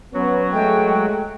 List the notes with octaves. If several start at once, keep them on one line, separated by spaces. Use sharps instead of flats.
F#3 B3 C#4 F#4
G#3 A3 G5